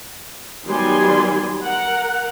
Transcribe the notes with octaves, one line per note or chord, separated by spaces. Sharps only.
D#3 F#3 G3 B3 G#5 C6
A#4 F#5